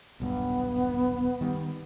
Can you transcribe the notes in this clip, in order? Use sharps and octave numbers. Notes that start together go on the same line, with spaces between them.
D#1 B1 G2 B3
D#3 G3